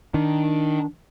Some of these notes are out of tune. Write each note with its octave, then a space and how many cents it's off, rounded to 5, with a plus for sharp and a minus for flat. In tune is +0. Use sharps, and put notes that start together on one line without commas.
D#3 +5 D4 +0